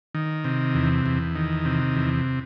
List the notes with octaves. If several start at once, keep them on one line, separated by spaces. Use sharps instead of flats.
D#3
C3
E2
E2
D#3
C3
E2